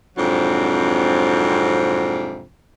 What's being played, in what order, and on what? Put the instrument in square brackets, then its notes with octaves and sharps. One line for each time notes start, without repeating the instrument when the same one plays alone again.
[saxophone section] F2 G#2 C3 F#3 D4